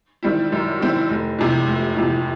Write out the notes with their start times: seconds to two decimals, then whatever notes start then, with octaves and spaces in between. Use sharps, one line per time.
0.23 D#3 G3 C4 E4
0.52 F#2
0.80 D#3 G3 C4 E4
1.10 F1
1.38 E2 C3 F3
1.67 F1
1.96 E2 C3 F3